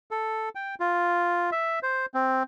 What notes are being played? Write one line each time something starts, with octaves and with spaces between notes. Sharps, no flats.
A4
G5
F4
E5
C5
C4